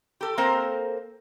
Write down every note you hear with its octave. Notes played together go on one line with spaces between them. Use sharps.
G4 A4
A#3 C4 A4 A#4 C5